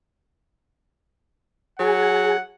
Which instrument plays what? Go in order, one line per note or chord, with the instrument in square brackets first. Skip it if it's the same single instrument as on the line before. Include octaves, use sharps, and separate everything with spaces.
[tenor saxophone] F#3 [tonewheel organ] G#4 [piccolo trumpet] F#5